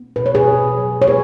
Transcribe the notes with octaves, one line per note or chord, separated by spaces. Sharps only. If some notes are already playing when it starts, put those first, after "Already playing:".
Already playing: B3
B2 B4
C#5
G#4 B4
B2
F#3
C#5
B3 G#4 B4